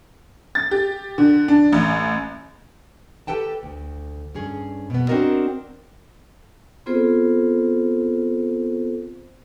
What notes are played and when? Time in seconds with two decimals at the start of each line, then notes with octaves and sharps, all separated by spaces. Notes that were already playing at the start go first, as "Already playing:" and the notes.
0.55 A6
0.71 G4
1.18 D3
1.48 D4
1.72 A1
3.27 G4 A4 B4 G5 A5
3.63 D2
4.35 G2 C#4 G#4
4.90 B2 B3
5.08 C4 D4 F#4 A#4 D#5
6.86 B3 C4 F4 G#4 A4 C5